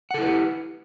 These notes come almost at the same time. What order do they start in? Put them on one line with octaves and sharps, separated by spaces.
F#5 A4 E4 B4 G4